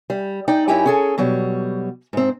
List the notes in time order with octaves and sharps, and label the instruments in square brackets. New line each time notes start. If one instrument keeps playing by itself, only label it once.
[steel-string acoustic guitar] G3
D#4 D5 G5
F#2 D#4 E4 G4 G5 G#5
C#4 G#4 A4
B2 F#3 G3
G#2 C4